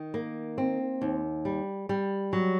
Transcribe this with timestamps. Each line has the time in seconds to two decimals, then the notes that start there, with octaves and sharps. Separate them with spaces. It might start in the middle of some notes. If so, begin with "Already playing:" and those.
Already playing: D#3
0.14 A#3
0.58 C4
1.02 D#2
1.45 G3
1.89 G3
2.33 F#3